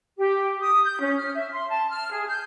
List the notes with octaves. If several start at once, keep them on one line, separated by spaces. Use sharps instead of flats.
G4
D#6
G6
C#4
F6
E5
C6
A5
F6
G#4
G6